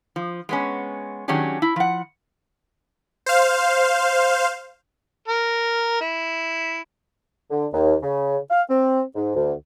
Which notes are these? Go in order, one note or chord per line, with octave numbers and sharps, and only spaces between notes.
F3
G#3 B3 C#4
D#3 F#3 C#4 D4 G4 G#4
E4
F3 F#5
C5 F5
A#4
E4
D3
D#2
C#3
F5
C4
G#2
D2